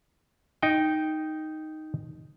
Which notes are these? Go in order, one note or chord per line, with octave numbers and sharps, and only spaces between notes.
D#4 G5